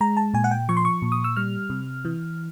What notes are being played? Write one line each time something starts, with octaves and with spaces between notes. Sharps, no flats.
G#3 A#5
A5
A#2 G#5
F#5
G5
F3 C#6
C6
C#6
A#2
D#6
E6
G3 F6
C3
E3